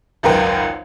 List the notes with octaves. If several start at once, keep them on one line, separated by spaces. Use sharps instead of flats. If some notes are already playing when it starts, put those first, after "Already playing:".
G#1 C#2 F#2 A#4 B4 G5